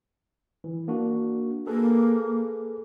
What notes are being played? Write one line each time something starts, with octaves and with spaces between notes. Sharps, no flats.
E3
A#3 D4 F#4
A#3 G#4 A4 B4